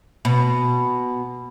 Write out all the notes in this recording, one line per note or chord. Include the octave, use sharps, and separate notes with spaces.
B2